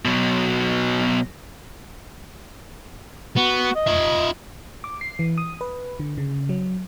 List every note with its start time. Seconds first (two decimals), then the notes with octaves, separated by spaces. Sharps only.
0.05 B2 F#3
3.36 B3 F#4
3.75 D#5
3.87 F4 E5
4.84 D6
5.01 C7
5.19 E3
5.38 D#6
5.61 B4
6.00 D3
6.18 C#3
6.49 F#3